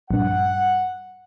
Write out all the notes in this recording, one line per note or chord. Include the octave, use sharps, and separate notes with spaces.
A#1 G2 F#5